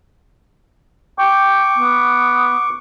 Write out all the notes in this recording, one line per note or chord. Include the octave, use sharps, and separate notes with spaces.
G5 C#6 D6
B3